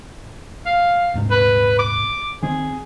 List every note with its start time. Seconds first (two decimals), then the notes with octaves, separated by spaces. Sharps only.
0.66 F5
1.14 D#1 G#2 C3
1.31 B4
1.79 D6
2.43 D#3 C4 G#4